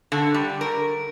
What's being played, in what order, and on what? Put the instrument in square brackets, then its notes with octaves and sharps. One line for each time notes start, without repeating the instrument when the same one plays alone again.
[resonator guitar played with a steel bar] D3
G3
A#4